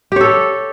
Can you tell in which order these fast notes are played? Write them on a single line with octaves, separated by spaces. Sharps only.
G4 C#5 A4